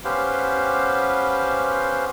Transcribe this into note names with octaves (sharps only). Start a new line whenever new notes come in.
B3 C#4 G4 B4 C5 F5